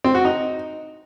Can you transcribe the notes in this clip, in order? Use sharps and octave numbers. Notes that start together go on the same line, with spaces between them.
C4
F#4
D#4